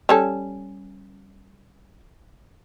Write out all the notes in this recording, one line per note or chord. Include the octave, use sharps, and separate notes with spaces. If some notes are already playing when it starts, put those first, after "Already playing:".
G3 C#4 A4